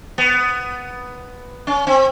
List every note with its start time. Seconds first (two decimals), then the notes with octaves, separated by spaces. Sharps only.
0.18 B3
1.67 C#4
1.87 C4